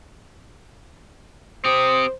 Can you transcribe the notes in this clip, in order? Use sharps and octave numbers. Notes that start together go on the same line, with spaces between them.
C4 G4 C5 D#6